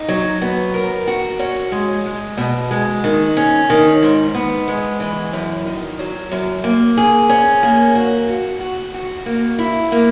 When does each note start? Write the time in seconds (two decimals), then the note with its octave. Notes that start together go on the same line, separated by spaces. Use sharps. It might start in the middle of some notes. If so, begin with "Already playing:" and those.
Already playing: D#4
0.08 F#3
0.42 B3
0.74 A#4
1.08 F#4
1.39 C#4
1.72 G#3
2.06 G#3
2.37 B2
2.71 G#3
3.04 D#3
3.37 C#4
3.70 D#3
4.03 G#2
4.34 B3
4.68 G#3
5.00 E3
5.33 F#2
5.66 D#3
5.99 F#3
6.32 F#2
6.64 A#3
6.97 G#4
7.29 C#4
7.63 A#3
7.95 F#4
8.28 F#4
8.61 F#4
8.94 F#4
9.26 A#3
9.59 E4
9.92 A#3